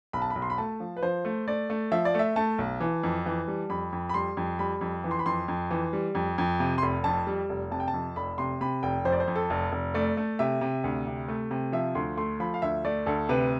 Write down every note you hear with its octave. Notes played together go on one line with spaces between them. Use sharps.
B1 B5
A5
B5
B1
C6
B5
A3 A5
F3
B4
F3 C5
A3
A3 D5
A3
F3 E5
D5
A3 E5
A3 A5
B1
E3
F2
E3
G3
F2 B5
F2
B5
G3 C6
F2
G3 B5
F2
E3
C6
B5
F2 C6
F2
E3
G3
F2
F2
C3
C6
F1 B5
F2 A5
G3
F1
C3 A5
G5
A5
F2
F1 B5
C3 C6
C3 B5
F1 G5
F2 C5
D5
C5
F2
A4
F1
F1
A3 D5
A3
C3 E5
C3
D2
C3
A3
C3
F3 E5
D2 C6
A3 C6
F3 B5
F5
D2 E5
A3 D5
D2 A4
C3 B4